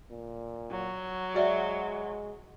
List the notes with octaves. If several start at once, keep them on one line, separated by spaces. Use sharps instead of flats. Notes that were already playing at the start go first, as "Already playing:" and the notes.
A#2
F#3
G#3 F#4 D5 E5